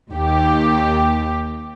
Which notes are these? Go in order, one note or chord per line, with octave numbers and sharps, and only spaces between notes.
D#2 G4